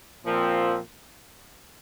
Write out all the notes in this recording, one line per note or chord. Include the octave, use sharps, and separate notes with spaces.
A#2 F3 C4